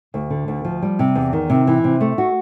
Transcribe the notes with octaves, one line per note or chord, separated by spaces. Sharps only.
D2
D3
D2
F3
G3
C3
E2
D#3
C3
E3
C3
A3
F#4